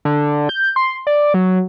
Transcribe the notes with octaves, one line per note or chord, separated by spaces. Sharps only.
D3
G6
C6
D5
F#3